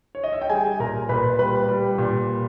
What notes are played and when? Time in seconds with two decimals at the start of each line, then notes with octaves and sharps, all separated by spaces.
0.15 C#5
0.24 D#5
0.32 E5
0.41 G5
0.50 G3 G#4 G#5
0.80 A#2 A#4 A#5
1.09 A#2 B4 B5
1.39 G3 B4 B5
1.68 G3
1.98 A#2